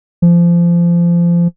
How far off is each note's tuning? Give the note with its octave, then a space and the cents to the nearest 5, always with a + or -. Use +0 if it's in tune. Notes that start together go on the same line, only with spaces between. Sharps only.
F3 -25